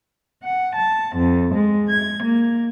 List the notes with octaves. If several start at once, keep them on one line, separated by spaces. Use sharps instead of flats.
F#5
A5
F2
G#3
G#6
A#3